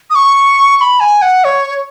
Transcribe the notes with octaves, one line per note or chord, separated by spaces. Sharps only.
D#6
C#6
C#6
B5
G#5
F#5
C#5